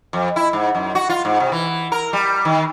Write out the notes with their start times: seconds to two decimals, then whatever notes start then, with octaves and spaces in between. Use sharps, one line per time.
0.13 F2
0.36 E4
0.53 G#2
0.75 F#2
0.95 F#4
1.10 F4
1.25 G#2
1.40 C3
1.52 E3
1.92 A#4
2.13 G3
2.45 D#3